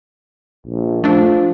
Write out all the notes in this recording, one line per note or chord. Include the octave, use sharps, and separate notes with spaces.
A#1
F3 A3 D4